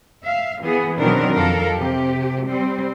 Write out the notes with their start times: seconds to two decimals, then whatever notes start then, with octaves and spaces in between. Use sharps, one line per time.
0.25 E5 F5
0.60 E3 B3 G#4
0.98 B2 D#3 F#3 C4 D4 A#4
1.36 F2 A4 A#4 F5
1.75 C3 G4
2.47 G3 C4